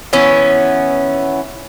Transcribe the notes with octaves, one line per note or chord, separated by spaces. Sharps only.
E3 B3 C#4